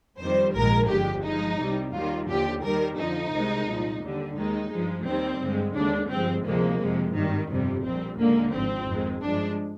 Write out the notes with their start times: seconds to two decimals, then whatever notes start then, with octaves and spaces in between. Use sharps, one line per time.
0.20 F2 D#3 G3 C5
0.55 A#1 G#2 D#3 G#3 A#4
0.90 G1 F2 D3 G#3 G4
1.24 G2 F3 G#3 D#4
1.59 C2 C3 G3
1.94 D#2 D#3 G3 F4
2.29 D#2 D3 F3 G4
2.63 D#2 D#3 G3 A#4
2.98 F2 D3 F3 D#4
3.33 C2 C3 D#3 G#3
3.68 C2 A#2 F3
4.02 D#2 D3 G3
4.36 D#2 D#3 G#3 D#4
4.72 G2 F3 G#3
5.06 D#2 D#3 G3 C4
5.41 G2 D3 G#3
5.75 D#2 D3 G#3 D4
6.11 G1 G2 F3 G#3 C4
6.45 D2 C3 F3 G#3 A#3
6.81 F2 C3 F3 G#3
7.15 G#1 G2 D#3 G3
7.50 G1 F2 C3 G3
7.84 A#1 A#2 G3 C4
8.19 D#2 D3 G#3 A#3
8.53 G#1 G#2 F3 C4
8.88 F2 D#3 G#3
9.23 G2 F3 G#3 D4